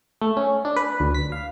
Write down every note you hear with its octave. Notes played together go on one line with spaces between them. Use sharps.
A3
C#4
D4
B4
D2
B6
F5